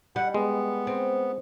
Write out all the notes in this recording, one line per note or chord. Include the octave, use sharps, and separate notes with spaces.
G3 F#5
G#3 B3
C4